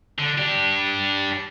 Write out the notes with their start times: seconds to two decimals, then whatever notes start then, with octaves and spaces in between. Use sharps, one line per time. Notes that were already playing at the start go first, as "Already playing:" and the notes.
0.19 D3
0.38 D4 G4